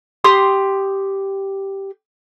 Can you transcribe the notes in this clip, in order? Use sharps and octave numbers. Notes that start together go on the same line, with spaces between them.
G4 C6 D#6